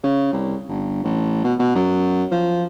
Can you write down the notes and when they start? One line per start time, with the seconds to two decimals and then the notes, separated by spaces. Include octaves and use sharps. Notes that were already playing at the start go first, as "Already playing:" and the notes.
0.03 C#3
0.33 C2
0.68 G1
1.04 A1
1.44 B2
1.59 B2
1.75 F#2
2.31 F3